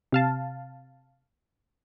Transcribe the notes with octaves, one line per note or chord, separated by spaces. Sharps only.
C3 F5 A5